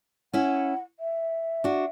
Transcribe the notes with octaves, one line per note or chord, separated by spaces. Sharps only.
C#4 E4 F#5
E5
D4 F#4